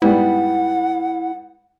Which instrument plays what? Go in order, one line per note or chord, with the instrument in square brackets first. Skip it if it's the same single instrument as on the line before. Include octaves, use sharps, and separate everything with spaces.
[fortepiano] G#2 G3 B3 [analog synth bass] E4 [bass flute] F#5